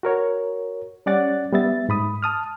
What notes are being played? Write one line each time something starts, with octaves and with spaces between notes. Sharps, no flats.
F#4 A#4 C#5
G3 C#4 D5 F#5 A6
G3 B3 E5 A6
G#2 B5 D#6
A5 D#6 F6